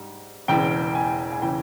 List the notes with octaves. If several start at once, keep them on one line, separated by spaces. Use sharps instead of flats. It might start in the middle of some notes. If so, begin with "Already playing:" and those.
Already playing: G#2 G3
E1 E2 C#3 E3 G5
G#5
G#5
C#3 E3 G5